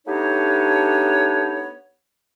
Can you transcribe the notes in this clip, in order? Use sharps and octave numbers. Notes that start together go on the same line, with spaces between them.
A3 B3 D4 D#4 G4 C#5